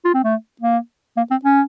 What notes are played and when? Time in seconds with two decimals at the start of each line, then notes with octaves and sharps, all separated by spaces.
0.05 F4
0.14 C4
0.24 A3
0.61 A#3
1.17 A#3
1.31 C4
1.45 C#4